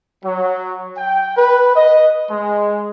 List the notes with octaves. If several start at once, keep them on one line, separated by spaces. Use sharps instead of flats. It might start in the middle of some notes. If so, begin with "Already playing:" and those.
F#3
G5
B4
D#5
G#3